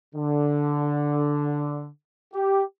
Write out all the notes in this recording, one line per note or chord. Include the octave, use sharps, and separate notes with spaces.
D3
G4